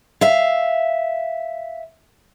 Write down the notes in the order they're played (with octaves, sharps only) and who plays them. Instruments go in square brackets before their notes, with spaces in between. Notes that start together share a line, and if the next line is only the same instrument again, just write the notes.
[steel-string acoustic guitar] E5 F5